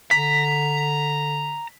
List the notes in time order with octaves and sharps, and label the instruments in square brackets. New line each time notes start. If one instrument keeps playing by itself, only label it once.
[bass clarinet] D3 [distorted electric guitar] A#5 [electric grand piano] B6